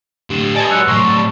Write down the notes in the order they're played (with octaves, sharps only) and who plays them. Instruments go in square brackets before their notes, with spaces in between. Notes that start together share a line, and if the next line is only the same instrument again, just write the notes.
[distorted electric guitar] A2 D3 [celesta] G4 E7
[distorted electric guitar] B4 D5 [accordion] D#5 G#5 A5
[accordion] F#3 G#3 [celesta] E6 F#6 C#7
[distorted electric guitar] A2 F#3 [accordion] A#5 C6 E6 [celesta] C#6
[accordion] G3 A5